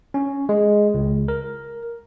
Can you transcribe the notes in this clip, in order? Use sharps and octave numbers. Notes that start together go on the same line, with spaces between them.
C#4
G#3
C#2
A#4